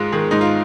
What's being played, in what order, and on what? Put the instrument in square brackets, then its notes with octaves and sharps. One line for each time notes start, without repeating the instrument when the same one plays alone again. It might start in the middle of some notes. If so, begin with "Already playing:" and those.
Already playing: [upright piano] G#2 G#3 F4
D#3 G#4
G#2 D#4
F4